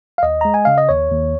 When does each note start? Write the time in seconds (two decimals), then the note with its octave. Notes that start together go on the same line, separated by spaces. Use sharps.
0.18 F5
0.23 D#2 D#5
0.41 G#3 A#5
0.54 G#5
0.65 C#3 F5
0.78 D#5
0.89 D#2 C#5
1.11 D#2